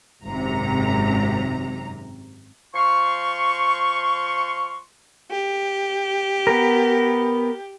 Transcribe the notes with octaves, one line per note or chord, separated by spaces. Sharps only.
G#1 F#2 C3 A#5
F3 F5 C6 C#6
G4
B3 A#4